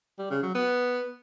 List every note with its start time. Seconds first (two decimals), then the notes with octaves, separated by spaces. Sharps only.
0.19 G3
0.31 C#3
0.43 F#3
0.55 B3